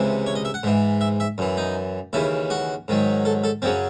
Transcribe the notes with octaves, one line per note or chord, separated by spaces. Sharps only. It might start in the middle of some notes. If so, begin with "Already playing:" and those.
Already playing: C#2 C3 E3
C#5
D#5
E5
F#5
G#2 E3
E5
E5
F#2 E3
D#4
D#2 C#3 E3 E4
F#4
G#2 D#3 F#3
A4
A4
F#2 C#3 F#3 C4